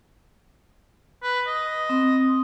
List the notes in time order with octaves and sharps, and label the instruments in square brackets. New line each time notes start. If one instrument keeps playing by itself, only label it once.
[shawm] B4
D#5
[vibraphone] C4 C6